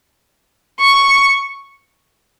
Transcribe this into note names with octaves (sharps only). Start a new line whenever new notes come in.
C#6